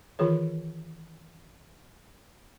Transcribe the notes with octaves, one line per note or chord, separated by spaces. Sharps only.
D#3 E3 F4 G#4 C#5